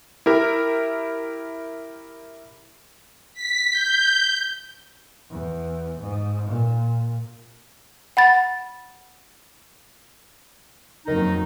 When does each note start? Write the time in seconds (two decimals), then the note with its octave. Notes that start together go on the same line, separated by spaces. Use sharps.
0.26 E4 G4 A#4
3.34 B6
3.71 G6
5.30 E2
5.99 G#2
6.48 A#2
8.17 F#5 B5 A6
11.07 F#1 F2 D#3 F#3 D#4